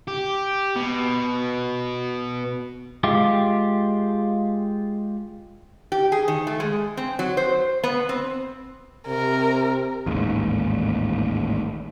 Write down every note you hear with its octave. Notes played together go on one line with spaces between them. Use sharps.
G4
B2
G#3 F4 G4
G4
G#4
D#3
A3
G#3
C4
F#3
C5
B3
C4
C3 A#4
A1 D#2 G#2